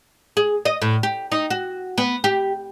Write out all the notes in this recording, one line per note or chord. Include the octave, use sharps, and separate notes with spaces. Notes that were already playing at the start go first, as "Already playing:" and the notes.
G#4
D#5
A2
G4
D#4
F#4
B3
G4